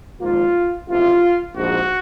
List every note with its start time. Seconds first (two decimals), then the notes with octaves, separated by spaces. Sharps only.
0.21 G#1 G#2 F3 A#3 F4
0.88 F#1 F2 C3 F4
1.55 A#1 G#2 F3 F#4